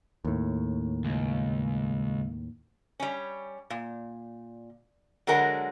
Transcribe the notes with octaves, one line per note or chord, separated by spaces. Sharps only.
D#2 A2
C#2
G3 C#4
A#2
D3 F#3 G#3 A#4 F#5